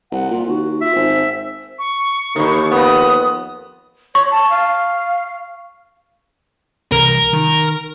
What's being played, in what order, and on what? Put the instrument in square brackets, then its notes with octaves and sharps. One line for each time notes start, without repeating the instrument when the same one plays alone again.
[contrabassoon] C2 [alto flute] F#5
[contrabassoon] A#2 [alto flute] F4
[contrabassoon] D#2 [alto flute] F#4
[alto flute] F4 [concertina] E5
[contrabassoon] G#1 [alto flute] C5
[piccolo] C#6
[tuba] D#2 [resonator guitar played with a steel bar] A2 D#3
[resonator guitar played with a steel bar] F2 B3 [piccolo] D#6
[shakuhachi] C#5 [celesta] C#6
[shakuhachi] A5
F5
[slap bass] C2 E3 [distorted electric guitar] A#4
[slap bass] D#3